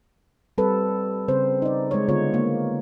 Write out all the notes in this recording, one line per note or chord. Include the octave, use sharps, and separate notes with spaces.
G3 C4 A4 B4
C#3 C4 C5
D#4 D5
G#3 C#5
D3 B3 F4 C#5
A#3